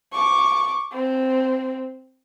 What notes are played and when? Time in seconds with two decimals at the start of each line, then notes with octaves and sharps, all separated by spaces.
0.12 C#6 D6
0.92 C4